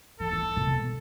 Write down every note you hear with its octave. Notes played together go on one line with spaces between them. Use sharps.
E3 A4
E3
C3
B2